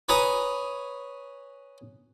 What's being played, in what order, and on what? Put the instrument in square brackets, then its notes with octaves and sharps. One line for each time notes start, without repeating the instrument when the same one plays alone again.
[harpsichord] B4 C#5 G#5 A#5 D#6